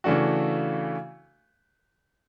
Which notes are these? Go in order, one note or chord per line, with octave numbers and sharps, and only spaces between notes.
C#3 E3 A3 D4 F#4